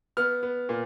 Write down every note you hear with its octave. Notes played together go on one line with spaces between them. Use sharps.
B3 F6
B3
A#2